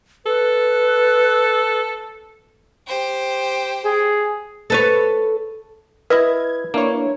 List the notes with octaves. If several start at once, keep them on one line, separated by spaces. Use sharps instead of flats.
A4 B4
G4 C5
G#4
A4 B4 C#5
E4 B4 D#5 E5 G#6
A#3 D4 E4 C#5